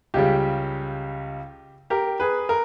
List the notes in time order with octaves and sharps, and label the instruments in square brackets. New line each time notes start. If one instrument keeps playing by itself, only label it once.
[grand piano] C#2 C#3 G3 G4
G4 A#4
G#4 B4
A#4